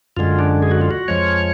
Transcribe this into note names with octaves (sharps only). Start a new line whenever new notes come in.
F#2 D3 G#3 F4
D4
G#4
F#4
F4
F#4
F2 F3 G#3 C#5